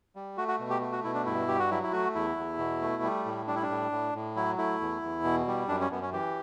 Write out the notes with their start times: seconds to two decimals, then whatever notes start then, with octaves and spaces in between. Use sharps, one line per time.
0.16 G3
0.37 A3 F#4
0.48 F#4
0.59 B2
0.70 G4
0.81 A3
0.92 F#4
1.04 B2 E4
1.14 D4
1.26 G2 E4
1.48 G2 G4
1.59 F#4
1.71 F#3 E4
1.83 E4
1.92 A3 F#4
2.15 E2 E4
2.37 E2
2.58 B2
2.82 A3
3.03 G3
3.25 A2
3.47 G3 D4
3.55 E4
3.62 D4
3.70 A2
3.91 A2
4.15 A2
4.36 F#3 E4
4.58 A3 E4
4.81 E2
5.03 E2
5.24 B2
5.47 G3
5.68 F#2 D4
5.81 C#4
5.91 F#2 B3
6.02 C#4
6.13 E3 G4